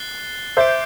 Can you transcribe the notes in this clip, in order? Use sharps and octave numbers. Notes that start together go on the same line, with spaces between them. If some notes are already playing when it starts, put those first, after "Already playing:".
Already playing: F#6 A6 C7 G7
C5 E5 D6 G6 D7